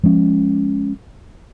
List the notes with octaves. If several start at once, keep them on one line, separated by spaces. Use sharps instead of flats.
F3 G#3 C#4